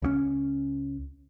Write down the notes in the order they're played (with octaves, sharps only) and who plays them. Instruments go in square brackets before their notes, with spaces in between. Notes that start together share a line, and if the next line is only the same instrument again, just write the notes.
[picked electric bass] C#2 F3 C#4